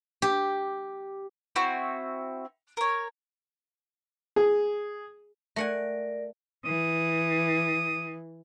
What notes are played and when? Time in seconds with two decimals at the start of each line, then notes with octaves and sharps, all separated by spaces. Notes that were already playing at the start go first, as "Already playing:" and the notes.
0.22 G4
1.56 C4 E4 F#4
2.77 A#4 C#5
4.36 G#4
5.56 A3 A#4 D5 F#5 G#5
6.65 E3 D#6